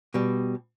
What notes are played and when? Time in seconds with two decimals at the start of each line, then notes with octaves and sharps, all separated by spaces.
0.14 B2 G3